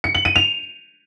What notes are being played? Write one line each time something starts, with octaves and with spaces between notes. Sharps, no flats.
C#7
F#7
D#7
F7